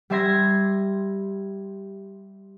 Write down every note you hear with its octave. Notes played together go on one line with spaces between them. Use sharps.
G3 G4 E5 C6 G#6 A#6